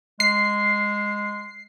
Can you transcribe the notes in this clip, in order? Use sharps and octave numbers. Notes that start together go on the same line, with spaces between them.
G#3 C7